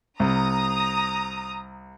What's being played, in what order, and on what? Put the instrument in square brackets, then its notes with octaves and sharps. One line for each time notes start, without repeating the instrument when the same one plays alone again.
[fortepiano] C2 [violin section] A#5 D#6